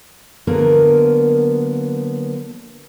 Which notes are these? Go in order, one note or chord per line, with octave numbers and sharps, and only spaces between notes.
D3 F#3 A#3 B3 A#4 B4